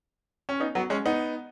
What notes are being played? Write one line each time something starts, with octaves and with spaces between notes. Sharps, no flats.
C#4
B3 D#4
F#3 B3
G#3 C#4
B3 D#4